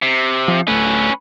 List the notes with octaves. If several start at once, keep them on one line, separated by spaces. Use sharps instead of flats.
C3
F3
D1 A3 C#4 B4